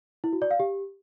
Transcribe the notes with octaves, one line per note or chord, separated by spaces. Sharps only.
E4
F#4
D5
F5
G4